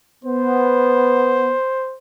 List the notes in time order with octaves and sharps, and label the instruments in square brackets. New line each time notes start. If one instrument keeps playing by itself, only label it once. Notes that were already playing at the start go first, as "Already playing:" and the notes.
[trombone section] B3 [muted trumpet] C5